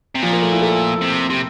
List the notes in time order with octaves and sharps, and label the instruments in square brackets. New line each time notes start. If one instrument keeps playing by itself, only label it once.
[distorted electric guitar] C3
[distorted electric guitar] A#2 [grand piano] F3
[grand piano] A#3
A3
E4
A4
[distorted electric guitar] C3
C3